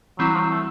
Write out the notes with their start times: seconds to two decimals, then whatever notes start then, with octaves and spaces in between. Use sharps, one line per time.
0.19 E3 F#3 G3 C4 E4
0.35 F3
0.40 F#3
0.50 A3